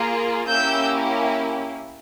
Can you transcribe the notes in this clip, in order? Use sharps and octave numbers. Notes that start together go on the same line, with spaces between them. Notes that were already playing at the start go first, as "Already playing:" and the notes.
Already playing: A#3 F4 G#4
A#3 C#4 E4 G4 E6 G6